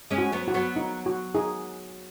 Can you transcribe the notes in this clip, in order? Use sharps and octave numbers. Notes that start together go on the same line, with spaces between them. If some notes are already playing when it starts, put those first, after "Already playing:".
G#3 C#4
F#4
F#3 B3
F#4
F#3 B3
D#4
F#4
D#4 G#4